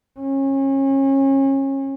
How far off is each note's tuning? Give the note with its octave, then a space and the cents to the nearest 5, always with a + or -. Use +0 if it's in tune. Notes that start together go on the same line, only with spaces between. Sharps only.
C#4 -30